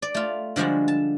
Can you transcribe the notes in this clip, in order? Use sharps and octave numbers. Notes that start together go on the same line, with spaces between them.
D5
A3 F4
D3 F3 G3 G#3 F#4
A5